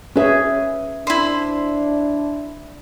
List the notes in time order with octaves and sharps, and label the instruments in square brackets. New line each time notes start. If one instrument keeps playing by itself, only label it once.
[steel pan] C#4 G#4 [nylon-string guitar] B4 C#5 E5
[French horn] D4 [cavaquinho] E4 C5